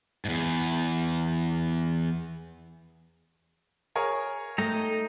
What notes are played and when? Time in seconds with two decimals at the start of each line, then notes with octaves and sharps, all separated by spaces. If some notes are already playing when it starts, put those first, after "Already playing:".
0.25 E2 G#2
3.96 G#4 A#4 C#5
4.58 A3 D#4 G5 A#5